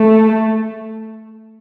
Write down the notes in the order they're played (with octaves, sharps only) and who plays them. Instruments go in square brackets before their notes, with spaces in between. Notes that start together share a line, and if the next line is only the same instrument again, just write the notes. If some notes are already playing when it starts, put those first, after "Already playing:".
Already playing: [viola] A3